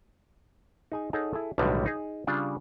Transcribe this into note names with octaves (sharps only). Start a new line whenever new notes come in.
D#4 G#4 G#5
D#4 G#4 A4 C#5 F#5
E4 G#4 A4
B1 A2 D3 D#3 G3 G#3
D#4 G#4
C#3 G3 D4 F4